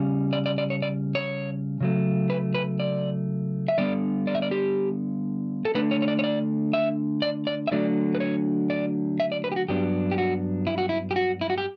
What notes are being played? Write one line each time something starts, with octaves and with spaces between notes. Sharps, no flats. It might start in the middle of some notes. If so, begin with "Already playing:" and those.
Already playing: C#3 G3 C#4
D5
D5
D5
C#5
D5
C#5
C#3 F#3 A3
B4
B4
D5
E5
D3 G3 B3 D5
D5
E5
D5
G4
A4
D3 A3 D4 B4
C#5
C#5
D5
C#5
D5
E5
D5
D5
E5
D3 F#3 A3 D4 D5
B4
C#5
D5
E5
D5
B4
G4
F#4
G2 F#3 B3 D4 G4
G4
F#4
E4
F#4
E4
G4
F#4
E4
F#4
G4